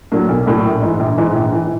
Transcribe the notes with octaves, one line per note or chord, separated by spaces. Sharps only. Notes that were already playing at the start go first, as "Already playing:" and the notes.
A2 F#3 A#3 D4
B1
A2 F#3 A#3 D4
A#1
G#2 E3
A#1
G#2 E3
A#1
E3